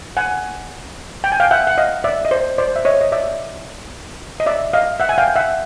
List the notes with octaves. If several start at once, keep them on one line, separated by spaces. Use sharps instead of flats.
F#5 G#5
G5
G#5
F5 G5
E5 F#5
F#5
D#5 F5
D5 E5
D#5
C5 D5
C5 D5
E5
C#5 D#5
D#5
D5 E5
D#5
D5 E5
D#5 F5
E5 F#5
G#5
F5 G5
E5 F#5